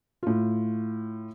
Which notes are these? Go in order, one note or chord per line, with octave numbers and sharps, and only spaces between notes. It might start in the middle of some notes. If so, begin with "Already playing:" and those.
A2 F4